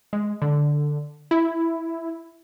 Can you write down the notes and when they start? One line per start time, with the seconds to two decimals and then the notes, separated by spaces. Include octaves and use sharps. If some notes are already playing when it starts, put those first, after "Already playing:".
0.13 G#3
0.42 D3
1.31 E4